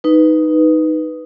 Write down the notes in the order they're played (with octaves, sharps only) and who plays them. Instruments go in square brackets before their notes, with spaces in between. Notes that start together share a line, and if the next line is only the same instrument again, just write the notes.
[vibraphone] D#4 B4